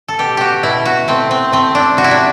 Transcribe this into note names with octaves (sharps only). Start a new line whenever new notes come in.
A4
B2 G4
F#4 G4
B2 E4
F#4
A3 C4
C4
A3 C4
D4
C3 F#4
E4
D4